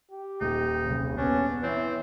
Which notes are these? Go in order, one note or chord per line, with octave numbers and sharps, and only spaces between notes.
G4
D#1 D#4
F#1 C2 C#3
B3 C#4 D4
E3 C4 C#5 E5